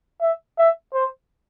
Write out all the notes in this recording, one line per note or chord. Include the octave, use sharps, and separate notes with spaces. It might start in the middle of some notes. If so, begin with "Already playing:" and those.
E5
E5
C5